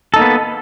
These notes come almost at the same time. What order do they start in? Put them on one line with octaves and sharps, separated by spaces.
A4 D#4 A#3 B3